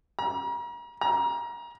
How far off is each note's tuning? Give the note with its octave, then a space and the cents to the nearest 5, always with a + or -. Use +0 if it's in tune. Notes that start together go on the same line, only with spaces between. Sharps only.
A#5 +40
A#5 +25